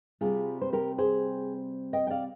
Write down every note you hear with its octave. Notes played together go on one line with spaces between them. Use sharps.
C3 G3 C4 F4 G#4
C5
G4 A#4
G#4 C5
D#5 G5
G5
D5 F5